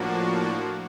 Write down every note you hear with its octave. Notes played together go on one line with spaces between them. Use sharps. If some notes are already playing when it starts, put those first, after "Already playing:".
Already playing: A2 F3 A#3 D4 F#4